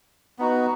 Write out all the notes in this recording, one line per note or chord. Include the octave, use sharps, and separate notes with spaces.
B3 D#4 F#4